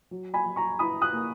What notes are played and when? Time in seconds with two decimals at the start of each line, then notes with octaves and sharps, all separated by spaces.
0.11 F#3
0.34 G#5 B5
0.46 F#3
0.56 A#5 C#6
0.79 E4 B5 D#6
1.02 D#6 F#6
1.13 A#3